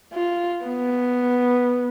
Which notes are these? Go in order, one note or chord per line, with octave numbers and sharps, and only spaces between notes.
F4
B3